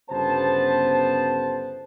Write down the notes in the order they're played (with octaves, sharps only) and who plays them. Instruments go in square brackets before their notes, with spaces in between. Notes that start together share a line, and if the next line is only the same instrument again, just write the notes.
[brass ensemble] G1 C#3 B3 C5 A5